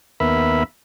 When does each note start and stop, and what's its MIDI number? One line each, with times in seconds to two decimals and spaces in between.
0.20 0.63 39
0.20 0.63 59
0.20 0.63 70
0.20 0.63 76
0.20 0.63 83